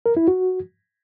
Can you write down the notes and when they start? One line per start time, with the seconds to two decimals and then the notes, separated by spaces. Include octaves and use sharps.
0.06 A#4
0.17 E4
0.28 F#4